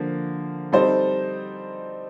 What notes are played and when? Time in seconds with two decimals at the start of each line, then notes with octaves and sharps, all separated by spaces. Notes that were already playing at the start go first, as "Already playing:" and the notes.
Already playing: D3 F3 A#3
0.72 G3 C4 D#4 A4 C5